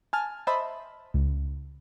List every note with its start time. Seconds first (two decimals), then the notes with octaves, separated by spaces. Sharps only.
0.13 G#5 A5 F6
0.47 C5 D#5 E5 A5 B5
1.14 C#2